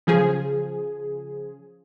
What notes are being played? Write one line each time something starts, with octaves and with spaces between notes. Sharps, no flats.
C#3 F3 G#4